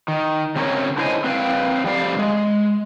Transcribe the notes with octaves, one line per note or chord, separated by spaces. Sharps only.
D#3
C#3 C4 C#4 G4 A#4 C#5
D3 E4 C5 C#5 D#5 G#5
C4 B4 C5 F5 G5
F2 G3 D5 F5
G#3